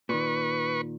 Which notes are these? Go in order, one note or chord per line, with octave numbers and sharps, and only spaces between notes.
A#2 D#3 B4 C#6